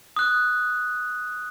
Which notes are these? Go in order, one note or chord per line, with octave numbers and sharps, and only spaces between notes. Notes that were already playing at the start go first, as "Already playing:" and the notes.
D#6 F#6